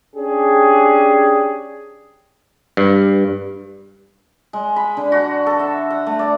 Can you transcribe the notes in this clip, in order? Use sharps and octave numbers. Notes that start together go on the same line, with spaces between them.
C#4 D4 G4 G#4
G2
G#3
B5
D3
F#4
A4
E5
F#5
A3
D5